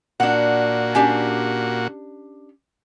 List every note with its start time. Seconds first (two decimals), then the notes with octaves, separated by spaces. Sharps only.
0.20 A#2 D4 F#4 F#5
0.95 C#4 D4 G4